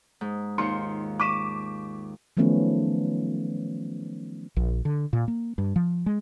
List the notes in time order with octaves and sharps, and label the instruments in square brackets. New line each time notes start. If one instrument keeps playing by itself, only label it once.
[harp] G#2
[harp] D#2 F4 [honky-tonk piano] D#3 C6 C#7
[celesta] C#6 B6 E7 [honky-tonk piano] D6 D#7
[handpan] D#3 F3 F#3 A3 B3 C#4
[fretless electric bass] A#1
D3
A#2
A#3
G2
F3
G#3